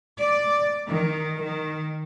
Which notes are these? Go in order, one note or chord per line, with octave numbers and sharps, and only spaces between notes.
D5
D#3
D#3